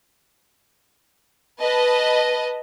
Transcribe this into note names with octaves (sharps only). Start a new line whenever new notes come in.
B4 D#5 A5